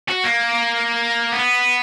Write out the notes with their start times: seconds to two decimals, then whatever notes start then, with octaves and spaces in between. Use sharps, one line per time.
0.09 F#4
0.24 A#3
1.32 B3